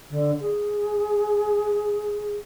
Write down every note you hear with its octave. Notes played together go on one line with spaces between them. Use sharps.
D3
G#4